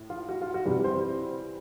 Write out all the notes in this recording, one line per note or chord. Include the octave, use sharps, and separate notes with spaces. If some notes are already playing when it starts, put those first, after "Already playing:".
Already playing: A2
F4
F#4
F4
F#4
C3 E3 G3
C5